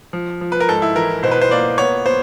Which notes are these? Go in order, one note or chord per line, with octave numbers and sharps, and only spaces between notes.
F3
F3
B4
A#4
G#2 A4
E4
E3 A#4
B2 C5
B4
C5
A#3 D5
B3 C#5
B3 C5